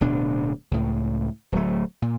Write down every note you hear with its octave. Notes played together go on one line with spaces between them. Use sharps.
D1 B2 D4
C#2 A2
D1 F#3 A3
A#2